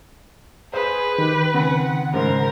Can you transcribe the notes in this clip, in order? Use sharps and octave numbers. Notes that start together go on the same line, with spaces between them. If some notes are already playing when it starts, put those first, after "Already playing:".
G#4 B4 C5
D#3 G4
C#3 C4 F#5
G#2 C#3 A#4 C5